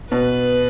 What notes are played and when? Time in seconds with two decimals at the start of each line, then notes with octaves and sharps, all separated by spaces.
0.11 B2 B4